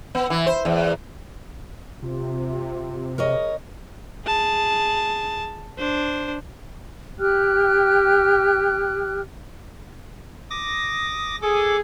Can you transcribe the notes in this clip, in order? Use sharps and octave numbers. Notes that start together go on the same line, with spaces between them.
B3
E3
C5
E2
C3 F4
G#4 A#4 C#5 D#5
G#4 A5
D4 C5
G4 G5 F6 F#6
D6 D#6 A#6
G#4 A4 D6